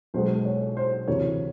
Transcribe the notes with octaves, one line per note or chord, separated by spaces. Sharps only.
B1 B2 G#3 C5
C#5
C5
D2 C3 E3 C#5